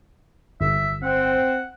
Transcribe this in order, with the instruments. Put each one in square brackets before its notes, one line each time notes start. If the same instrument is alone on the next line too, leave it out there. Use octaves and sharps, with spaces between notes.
[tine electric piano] G1 [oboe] E5
[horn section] C4 [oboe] F#5